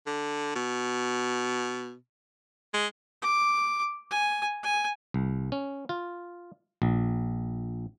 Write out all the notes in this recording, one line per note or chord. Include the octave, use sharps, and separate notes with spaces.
D3
B2
G#3
D6
G#5
G#5
C2
C#4
F4
A#1